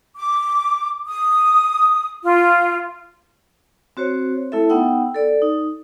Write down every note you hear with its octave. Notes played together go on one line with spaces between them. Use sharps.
D6
D#6
F4
C4 F#4 C5 C#5
A3 E4 A4 E5
B3 D#4 F#5 G5 E6
A4 D5
D#4